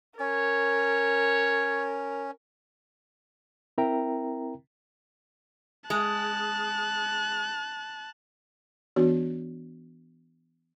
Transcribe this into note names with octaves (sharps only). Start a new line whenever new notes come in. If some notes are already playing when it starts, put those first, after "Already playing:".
C#4 A#4 C#5
C4 E4 A#4 E5 G5 A#5
G#3 A5 F#6
E3 B3 D4 F#4 C#5